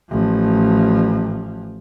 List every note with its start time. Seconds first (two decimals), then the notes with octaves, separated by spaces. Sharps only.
0.11 A1 F3